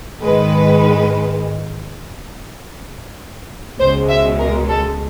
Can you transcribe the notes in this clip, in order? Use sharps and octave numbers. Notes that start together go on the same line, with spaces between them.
G#2 D#3 G#3 B4
C#2 B2 G#3 C5
E5
A#4
A4